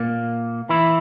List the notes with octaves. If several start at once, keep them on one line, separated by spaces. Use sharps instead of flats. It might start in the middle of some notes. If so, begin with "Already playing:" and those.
Already playing: A#2 A#3
E3 E4